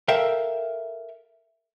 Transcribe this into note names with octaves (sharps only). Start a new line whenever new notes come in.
A4 A#4 E5 F5 G5